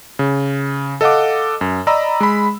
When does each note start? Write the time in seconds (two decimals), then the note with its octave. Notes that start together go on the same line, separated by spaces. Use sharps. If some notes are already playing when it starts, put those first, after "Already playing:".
0.19 C#3
1.01 A4 D#5 F5 F#5 D6
1.61 F#2
1.87 D5 D#5 A#5 B5 E6
2.20 G#3 B5